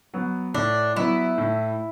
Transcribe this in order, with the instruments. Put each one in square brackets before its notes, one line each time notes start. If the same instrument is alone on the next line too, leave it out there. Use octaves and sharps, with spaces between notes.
[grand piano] F#3 B3
[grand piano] A2 [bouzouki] D4
[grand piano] F#3 B3 [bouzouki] E4
[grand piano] A2